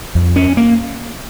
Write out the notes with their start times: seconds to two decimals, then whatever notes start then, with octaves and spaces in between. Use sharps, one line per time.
0.15 F2
0.36 C#4
0.57 A#3